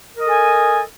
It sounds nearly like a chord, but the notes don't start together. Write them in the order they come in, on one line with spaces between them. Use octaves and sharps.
A#4 D#5 A4 G#5